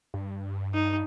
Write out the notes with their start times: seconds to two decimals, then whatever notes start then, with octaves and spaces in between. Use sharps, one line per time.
0.14 G2
0.74 D#4